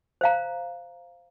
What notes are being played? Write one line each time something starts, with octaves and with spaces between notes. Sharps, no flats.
C5 F5 A#5